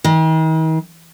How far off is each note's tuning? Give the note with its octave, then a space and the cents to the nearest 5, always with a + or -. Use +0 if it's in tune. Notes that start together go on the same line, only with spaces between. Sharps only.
D#3 +45